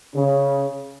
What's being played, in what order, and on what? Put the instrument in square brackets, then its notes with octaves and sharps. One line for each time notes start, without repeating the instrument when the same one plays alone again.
[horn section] C#3